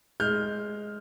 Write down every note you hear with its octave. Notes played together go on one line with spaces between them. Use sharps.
G#3 F6 G6